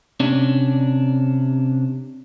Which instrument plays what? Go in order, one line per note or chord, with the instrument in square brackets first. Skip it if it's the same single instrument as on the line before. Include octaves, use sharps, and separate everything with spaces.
[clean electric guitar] C3 C#4 D4